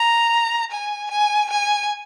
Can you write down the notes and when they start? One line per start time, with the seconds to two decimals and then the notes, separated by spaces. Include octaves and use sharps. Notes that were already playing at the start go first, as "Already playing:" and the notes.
Already playing: A#5
0.72 G#5
1.11 G#5
1.50 G#5